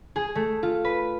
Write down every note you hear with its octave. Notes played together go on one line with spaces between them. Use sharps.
G#4
A3
F4
B4